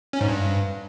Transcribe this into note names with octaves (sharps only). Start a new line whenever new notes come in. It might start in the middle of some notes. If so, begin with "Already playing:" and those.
C#4
G#2
G2